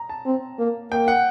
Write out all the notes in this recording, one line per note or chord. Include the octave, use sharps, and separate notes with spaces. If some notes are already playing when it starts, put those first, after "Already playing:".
Already playing: A#5
A5
C4
A#3
A#3 G5
F#5